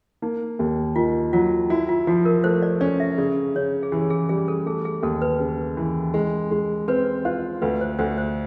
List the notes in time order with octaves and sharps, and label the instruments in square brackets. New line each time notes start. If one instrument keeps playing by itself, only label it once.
[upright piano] A#3 [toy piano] D#4
[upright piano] D#2
[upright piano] D#3 [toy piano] F4
[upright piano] F#3 [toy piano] F4
[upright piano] E4 [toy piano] F#4
[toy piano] F4
[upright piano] F3 [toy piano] F#4
[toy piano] A#4
[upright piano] A3 [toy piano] C5
[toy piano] D5
[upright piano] C#4 [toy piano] D5
[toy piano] E5
[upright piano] C#3 [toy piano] D5
[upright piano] C#3 [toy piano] C#5
[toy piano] G#4
[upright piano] E3 [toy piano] G4
[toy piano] G#4
[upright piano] G3 [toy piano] G#4
[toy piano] A4
[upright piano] A3 [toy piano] G#4
[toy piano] G#4
[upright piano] D#2 [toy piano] A4
[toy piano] B4
[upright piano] C#3
E3
G#3
G#3
[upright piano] C4 [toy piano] B4
[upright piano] F4 [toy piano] C5
[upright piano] D2 [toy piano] B4
[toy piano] C5
[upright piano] D2 [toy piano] C5
[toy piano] C5